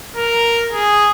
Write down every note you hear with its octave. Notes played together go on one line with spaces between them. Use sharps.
A#4
G#4